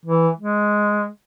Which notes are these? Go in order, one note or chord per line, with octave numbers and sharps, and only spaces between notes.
E3
G#3